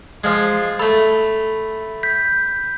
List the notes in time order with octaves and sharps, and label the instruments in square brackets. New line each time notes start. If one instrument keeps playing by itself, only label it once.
[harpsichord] F3 G#3
[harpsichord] A3 A4 [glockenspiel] B5
[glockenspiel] G6 B6